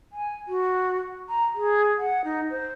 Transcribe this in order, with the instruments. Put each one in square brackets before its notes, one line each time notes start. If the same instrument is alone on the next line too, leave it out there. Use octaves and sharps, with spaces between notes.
[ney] G#5
F#4
A#5
G#4
F#5
D#4
C5